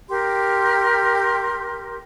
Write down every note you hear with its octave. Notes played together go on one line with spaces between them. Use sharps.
G4 A#4 C6